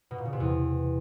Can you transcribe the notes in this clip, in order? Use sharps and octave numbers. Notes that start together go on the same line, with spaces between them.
B2
A#2
C#3
C3
E2